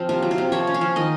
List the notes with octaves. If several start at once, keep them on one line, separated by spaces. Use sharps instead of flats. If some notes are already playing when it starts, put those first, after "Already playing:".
Already playing: F3 C4
C3 F4
F#3
F4
C3
F3 C#5
C#4
F5
F3
D#3 D#5